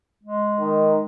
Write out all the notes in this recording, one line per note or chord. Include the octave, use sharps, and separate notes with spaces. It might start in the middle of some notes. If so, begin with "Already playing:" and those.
G#3
D#3